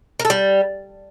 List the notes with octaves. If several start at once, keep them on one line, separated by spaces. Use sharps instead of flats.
A#4
A4
G3